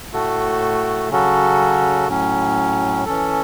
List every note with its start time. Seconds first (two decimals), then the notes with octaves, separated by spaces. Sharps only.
0.12 A2 A3 F#4 A4
1.10 C#3 F#3 C#4 F#4 A4
2.08 A2 F#3 C#4
3.05 E3 C#4 A4